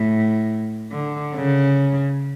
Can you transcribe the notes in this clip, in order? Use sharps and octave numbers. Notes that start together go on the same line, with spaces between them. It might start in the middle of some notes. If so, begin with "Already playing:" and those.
Already playing: A2
D3
C#3